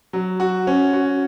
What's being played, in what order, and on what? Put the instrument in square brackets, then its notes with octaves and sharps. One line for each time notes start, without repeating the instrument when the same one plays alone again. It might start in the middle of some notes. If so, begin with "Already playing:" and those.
[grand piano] F#3
F#4
C#4
F#4